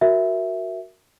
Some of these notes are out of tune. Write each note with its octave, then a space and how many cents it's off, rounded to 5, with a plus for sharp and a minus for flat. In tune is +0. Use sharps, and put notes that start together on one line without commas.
F#4 +0 A#4 +0 E5 +0